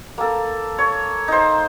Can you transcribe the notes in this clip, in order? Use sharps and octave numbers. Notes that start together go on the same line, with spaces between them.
A#3 A4
C#5
D#4 C5